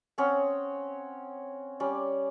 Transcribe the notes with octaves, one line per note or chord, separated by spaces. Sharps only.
C4 C#4 F#5 D#6
G3 C#4 D5